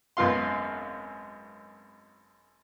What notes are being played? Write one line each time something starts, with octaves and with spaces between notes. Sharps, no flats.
G#1 F#2 B3 F4 F5 C6